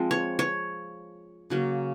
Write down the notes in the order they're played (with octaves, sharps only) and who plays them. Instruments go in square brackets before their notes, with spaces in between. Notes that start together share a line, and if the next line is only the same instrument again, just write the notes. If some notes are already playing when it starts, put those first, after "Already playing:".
Already playing: [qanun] F3 G#3 C4
C#5
C#5
C#3 F#3 A#3